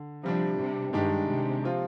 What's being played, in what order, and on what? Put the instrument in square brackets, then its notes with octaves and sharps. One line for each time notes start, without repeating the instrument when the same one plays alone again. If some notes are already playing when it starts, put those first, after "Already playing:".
Already playing: [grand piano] D3
[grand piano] C3 G3 D4 [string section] F3
[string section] C3
[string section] G2 [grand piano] D#3 G#3 D4 G4
[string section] C3
[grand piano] C3 F3 C4 F4